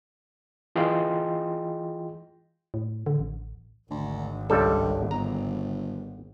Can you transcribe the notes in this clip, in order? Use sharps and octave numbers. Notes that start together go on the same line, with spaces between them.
E3 F4 G#4 D#5 G5 C6
A2
D3
A1
G#1 D2
C#2 G2 G3 A4
G1 A#5